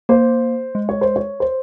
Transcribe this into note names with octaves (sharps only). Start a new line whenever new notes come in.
A#3 C5
G#3
C#5
C5
C#5
C5